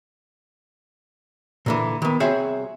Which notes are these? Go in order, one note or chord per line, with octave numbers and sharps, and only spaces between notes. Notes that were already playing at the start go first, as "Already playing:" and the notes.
A#2 D3 E3
D#3 B3
C2 C4 F#4 G#4 C#5 E5